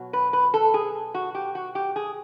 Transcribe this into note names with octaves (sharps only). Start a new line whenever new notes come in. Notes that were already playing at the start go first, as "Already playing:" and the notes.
Already playing: B2 F#3
B4
B4
A4
G#4
F#4
G4
F#4
G4
G#4